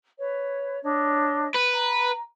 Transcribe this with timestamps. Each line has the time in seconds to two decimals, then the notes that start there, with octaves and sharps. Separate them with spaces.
0.18 B4 C#5
0.83 D4 C#5 D#5
1.55 B4
1.73 A#5